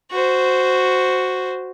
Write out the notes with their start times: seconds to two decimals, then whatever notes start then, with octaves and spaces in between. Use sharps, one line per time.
0.11 F#4 C5